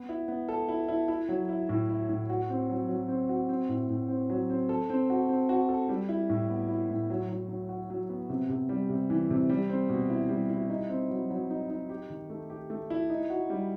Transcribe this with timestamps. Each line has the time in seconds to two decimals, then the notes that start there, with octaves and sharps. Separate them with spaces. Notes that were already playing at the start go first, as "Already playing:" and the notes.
Already playing: B3
0.09 E4
0.28 B3
0.49 A4
0.69 E4
0.88 E4
1.08 E4
1.29 F#3
1.49 E4
1.69 A2
1.89 E4
2.09 A2
2.30 F#4
2.50 C4
2.70 F#3
2.89 F#3
3.08 C4
3.29 F#4
3.49 C4
3.69 A2
3.89 A2
4.09 C4
4.30 F#3
4.50 C4
4.69 A4
4.90 C4
5.10 F#4
5.29 C4
5.49 F#4
5.69 A4
5.89 G3
6.09 E4
6.29 A2
6.49 B3
6.69 E4
6.90 A2
7.10 F#3
7.29 F#3
7.49 F#3
7.69 F#4
7.90 F#3
8.09 B3
8.30 C3
8.49 C3
8.69 G3
8.89 C3
9.10 E3
9.30 C3
9.49 G3
9.69 C4
9.89 B2
10.10 E4
10.29 G3
10.50 E4
10.69 D#4
10.89 C4
11.10 F#3
11.30 F#3
11.50 D#4
11.70 D#4
11.89 G4
12.10 D#3
12.30 A3
12.50 G4
12.70 A3
12.90 E4
13.10 D#4
13.30 F#4
13.50 G3